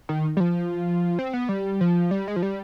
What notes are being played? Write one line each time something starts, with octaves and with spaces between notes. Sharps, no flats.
D#3
G3
F3
C4
B3
G3
F3
G3
G#3
F3
G3